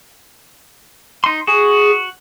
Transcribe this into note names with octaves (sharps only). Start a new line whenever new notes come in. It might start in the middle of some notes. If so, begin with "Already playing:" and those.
D#4 C6
F#4 G#4